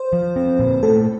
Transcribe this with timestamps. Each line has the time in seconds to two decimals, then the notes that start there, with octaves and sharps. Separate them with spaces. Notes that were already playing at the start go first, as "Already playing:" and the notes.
Already playing: C5
0.13 F3
0.36 C4
0.59 A#2
0.83 A3 A4